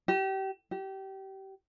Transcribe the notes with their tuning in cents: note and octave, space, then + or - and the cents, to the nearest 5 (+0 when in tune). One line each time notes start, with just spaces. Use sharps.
G4 -30
G4 -25